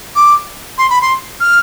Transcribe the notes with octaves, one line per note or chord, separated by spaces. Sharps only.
D6
C6
B5
C6
F6